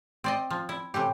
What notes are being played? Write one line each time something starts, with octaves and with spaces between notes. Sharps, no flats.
C4 D5 D#5
F3
E4
A2 C3 E3 G4